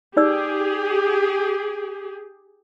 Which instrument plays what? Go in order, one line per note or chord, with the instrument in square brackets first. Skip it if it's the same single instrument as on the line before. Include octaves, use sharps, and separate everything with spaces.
[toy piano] D#4 D5 E6 [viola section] G4 G#4